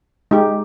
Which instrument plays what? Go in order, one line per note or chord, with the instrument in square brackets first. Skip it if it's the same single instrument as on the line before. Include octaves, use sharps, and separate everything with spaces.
[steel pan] G#3 D#4 G4